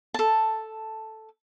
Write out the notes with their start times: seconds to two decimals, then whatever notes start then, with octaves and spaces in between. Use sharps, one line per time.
0.14 A4 A5